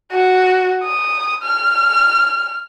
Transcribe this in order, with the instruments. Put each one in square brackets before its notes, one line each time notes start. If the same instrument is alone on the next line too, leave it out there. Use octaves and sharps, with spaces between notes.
[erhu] F#4
D#6
F6